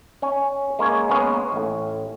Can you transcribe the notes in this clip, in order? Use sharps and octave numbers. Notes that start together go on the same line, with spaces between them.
C#4 G#5
G#3 A#3 C#4 C#5
G#3 A#3 B3 C#4
A1 A2